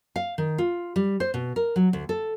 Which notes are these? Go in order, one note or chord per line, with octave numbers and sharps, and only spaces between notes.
F5
D#3
F4
G3
C5
B2
A#4
F#3
D2
A4